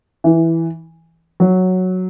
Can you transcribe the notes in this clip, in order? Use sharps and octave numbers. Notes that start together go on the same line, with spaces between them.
E3
F#3